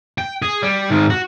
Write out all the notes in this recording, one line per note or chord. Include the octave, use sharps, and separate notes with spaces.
G5
G#4
G3
G#2 D#3
F#4